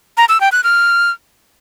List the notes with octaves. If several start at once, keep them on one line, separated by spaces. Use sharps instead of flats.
A#5
E6
G5
F#6
F6